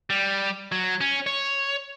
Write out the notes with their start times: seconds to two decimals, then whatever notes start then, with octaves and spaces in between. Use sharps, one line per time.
0.10 G3
0.72 F#3
1.01 C#4
1.27 C#5